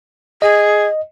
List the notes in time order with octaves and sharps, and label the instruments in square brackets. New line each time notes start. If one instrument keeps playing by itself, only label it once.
[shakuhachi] G#4 [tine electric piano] D#5